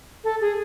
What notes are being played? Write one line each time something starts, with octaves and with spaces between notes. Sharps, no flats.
A4
G#4